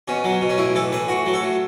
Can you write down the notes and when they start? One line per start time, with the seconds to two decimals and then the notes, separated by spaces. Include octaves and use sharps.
0.08 B2 C#4
0.24 F#3
0.41 B2
0.49 C#4
0.58 A2 E4
0.75 E3 A4
0.92 A2 B4
1.08 A2 F#4
1.26 F#3
1.34 A4
1.42 A2